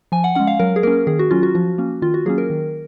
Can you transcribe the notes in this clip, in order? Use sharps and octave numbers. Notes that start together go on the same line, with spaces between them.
F3 G#5
F#5
G#3 C#4 F#5
F5
F#3 A#4
G#4
A#3 C#4 A#4
D#3 G#4
F#4
F#3 C#4 F4
F#4
F3 F#4
A#3 C#4
D#3 F4
F#4
F#3 A#3 C#4 G#4
A#4
D#3